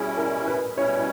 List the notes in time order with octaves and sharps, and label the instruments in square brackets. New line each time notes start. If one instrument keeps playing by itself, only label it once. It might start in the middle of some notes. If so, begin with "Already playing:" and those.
Already playing: [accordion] B2 G3 C#4 E4 [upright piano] G#4
[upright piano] A#4
B4
[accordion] B2 G3 C#4 E4 [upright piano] C#5